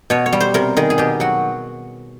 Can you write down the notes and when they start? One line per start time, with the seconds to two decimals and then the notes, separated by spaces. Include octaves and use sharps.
0.10 B2 C#5
0.26 C#5
0.33 G3
0.40 C5
0.54 C3 A#4
0.77 D#3 G#4
0.90 G#4
0.98 B2 G4
1.20 F#3 F#4